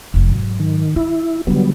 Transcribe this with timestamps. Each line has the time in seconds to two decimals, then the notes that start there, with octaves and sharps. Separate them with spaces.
0.14 F1 F3
0.28 G#2 F#3
0.60 D#3
0.96 E4 F4
1.47 D3 F#3 G3 B3 D4